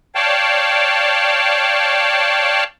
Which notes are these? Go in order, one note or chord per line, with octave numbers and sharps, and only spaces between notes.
C#5 D5 F5 G5 A5